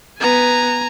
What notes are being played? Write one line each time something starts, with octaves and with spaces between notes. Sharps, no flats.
B3 B4 G#5 A#5